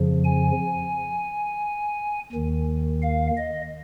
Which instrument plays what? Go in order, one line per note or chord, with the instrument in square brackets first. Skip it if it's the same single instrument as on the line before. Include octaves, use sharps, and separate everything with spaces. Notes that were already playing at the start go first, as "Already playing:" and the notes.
Already playing: [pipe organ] F2 C#3 F3
G#5
D#2 D#3
F5
D#5